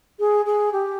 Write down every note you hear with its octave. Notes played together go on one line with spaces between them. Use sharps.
G#4
G#4
G4